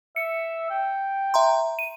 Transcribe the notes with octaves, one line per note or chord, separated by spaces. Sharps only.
E5 C#7
G5
E5 A#5 C6
D#7